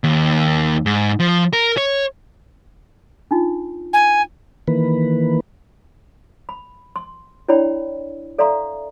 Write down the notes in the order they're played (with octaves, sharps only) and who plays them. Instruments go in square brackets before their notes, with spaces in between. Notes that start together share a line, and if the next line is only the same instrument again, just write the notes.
[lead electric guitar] D#2
G#2
F3
A#4
C#5
[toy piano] D4 D#4 F4
[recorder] G#5
[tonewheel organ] D#3 E3 A#3 B4
[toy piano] B5
C6
D4 E4 C#5 D5 G5 B5
A4 D5 E5 F5 A#5 C6